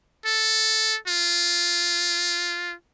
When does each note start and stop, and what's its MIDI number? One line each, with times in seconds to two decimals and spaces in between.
0.26 0.97 69
1.07 2.74 65